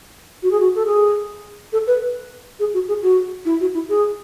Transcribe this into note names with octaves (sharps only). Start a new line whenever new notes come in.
F#4
G#4
F#4
A4
G#4
A4
B4
G#4
F#4
G#4
F#4
E4
F#4
E4
G#4